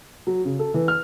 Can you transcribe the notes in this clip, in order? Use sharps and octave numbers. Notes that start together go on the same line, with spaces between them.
F#3
C#3
A4
E3
F6